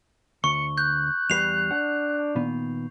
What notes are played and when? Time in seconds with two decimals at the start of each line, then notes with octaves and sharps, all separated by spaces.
0.44 D2 C#6 C#7
0.78 F#6 G6
1.30 E2 G3 B4 C7 F7
1.71 D4 F#5
2.35 A#2 D#3 B3